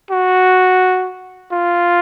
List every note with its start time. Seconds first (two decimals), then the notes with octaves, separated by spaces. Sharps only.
0.11 F#4
1.52 F4